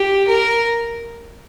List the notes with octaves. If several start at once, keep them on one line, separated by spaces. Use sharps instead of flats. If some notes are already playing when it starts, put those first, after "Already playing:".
Already playing: G4
A#4